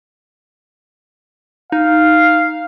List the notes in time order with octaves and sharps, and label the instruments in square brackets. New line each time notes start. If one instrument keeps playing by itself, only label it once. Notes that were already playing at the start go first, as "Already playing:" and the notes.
[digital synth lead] D#4 [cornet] F5